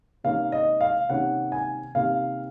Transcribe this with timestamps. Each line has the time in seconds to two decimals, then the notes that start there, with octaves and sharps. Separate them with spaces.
0.24 C3 D#3 A#3 C#4 F5
0.52 D#5
0.81 F5
1.10 C3 D#3 A#3 C#4 F#5
1.52 G#5
1.95 C3 D#3 A#3 C#4 F5